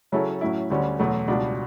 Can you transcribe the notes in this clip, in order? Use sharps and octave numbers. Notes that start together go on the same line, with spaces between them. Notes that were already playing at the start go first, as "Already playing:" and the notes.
C#3 F#3 C#4 E4 A4
A2 F#3 C#4 E4
D2 D3 G3 C#4
E2 B2 F#3 A3
C#2 B2 G3 D4